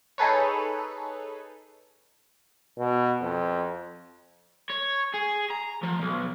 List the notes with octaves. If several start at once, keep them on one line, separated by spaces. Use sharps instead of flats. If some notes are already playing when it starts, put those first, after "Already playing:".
D#4 G#4 A4 B4 C#5
B2
F2
C#5
G#4
A#5
F3
B1